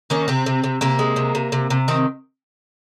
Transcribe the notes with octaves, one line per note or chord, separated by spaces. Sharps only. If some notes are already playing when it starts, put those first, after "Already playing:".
D#3 A#3 C#4
C3 C4
C3
C3
C3 A#3
G#3
C3
C3
C3
C3
D#3 C4